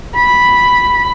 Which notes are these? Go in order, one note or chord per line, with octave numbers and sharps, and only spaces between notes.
B5